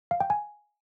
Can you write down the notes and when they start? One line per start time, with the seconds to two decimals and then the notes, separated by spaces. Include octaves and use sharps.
0.11 F5
0.20 G5
0.30 G#5